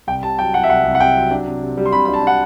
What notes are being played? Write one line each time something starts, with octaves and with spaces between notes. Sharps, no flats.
C2 G5
C3 A5
F#3 G5
F#3 F#5
E5
C2 F#5
C2
F#5
C3 G5
F#3
D4
C3
C3
G3
C6
C3 B5
B5
D4
A5
D4 F#5